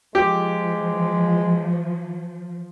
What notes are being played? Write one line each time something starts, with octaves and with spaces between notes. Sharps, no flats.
F3 G#3 G4